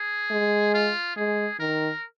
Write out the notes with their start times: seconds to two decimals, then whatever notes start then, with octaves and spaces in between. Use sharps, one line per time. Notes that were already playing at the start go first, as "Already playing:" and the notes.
Already playing: G#4
0.31 G#3
0.74 F4
1.16 G#3 G#4
1.60 D#3 A#4